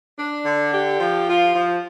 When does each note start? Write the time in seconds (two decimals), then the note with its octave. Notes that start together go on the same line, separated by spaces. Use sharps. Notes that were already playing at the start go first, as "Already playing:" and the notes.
0.17 D4
0.45 D3
0.72 G4
0.99 F3
1.27 F4
1.55 F3